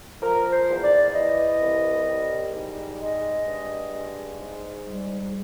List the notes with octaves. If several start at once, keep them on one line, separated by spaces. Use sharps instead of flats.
F3 A#4
C5
E2
D5
E3 D#5
C2
G3
G#2
G#3 D#5
G2
G#3
G#2
G3